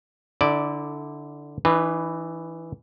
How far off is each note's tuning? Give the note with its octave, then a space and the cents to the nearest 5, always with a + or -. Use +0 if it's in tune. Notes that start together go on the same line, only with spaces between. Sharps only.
D3 +0 E4 -30 D5 +0
E3 +0 D#4 -45 B4 +0